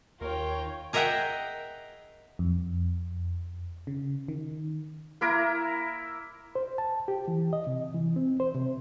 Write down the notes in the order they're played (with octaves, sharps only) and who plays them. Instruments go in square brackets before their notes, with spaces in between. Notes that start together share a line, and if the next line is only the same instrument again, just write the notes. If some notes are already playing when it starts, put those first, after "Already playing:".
[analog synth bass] D#2 [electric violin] F4 G5 [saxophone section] A#4 [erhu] C#5
[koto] G#4 A#4 D#5 E5 F#5 G5
[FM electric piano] F2
C#3
D#3
[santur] A#3 E4 A#4
[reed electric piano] C5
A5
G4
E3
D#5
C3
E3
C4
C5
C3